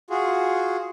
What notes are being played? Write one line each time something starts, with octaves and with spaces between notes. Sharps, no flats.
F4 F#4 G#4